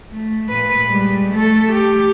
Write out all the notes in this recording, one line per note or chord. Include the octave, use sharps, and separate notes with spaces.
A3
A#2 B4
G3 G#3
A3 A4
G4